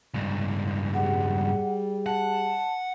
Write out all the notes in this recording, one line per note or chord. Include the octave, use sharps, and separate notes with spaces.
C#2 G2
G3 G#4 F#5
F#5 A5